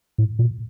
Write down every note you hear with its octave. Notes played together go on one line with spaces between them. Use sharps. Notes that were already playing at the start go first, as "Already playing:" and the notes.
A2
A#2